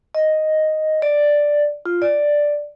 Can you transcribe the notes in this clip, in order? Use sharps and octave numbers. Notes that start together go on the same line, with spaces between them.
D#5
D5
F4
D5